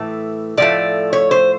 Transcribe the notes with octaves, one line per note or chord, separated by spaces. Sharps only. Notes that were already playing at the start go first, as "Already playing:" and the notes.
Already playing: A2 E3 A3
A2 F3 A3 D5
C#5
C5